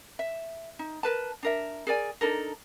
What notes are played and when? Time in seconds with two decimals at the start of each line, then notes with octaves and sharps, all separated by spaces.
0.19 E5
0.79 D#4
1.03 A#4 B4 A5
1.43 D4 A#4 E5
1.87 G#4 A#4 D5 G#5
2.21 D4 D#4 A4 A#4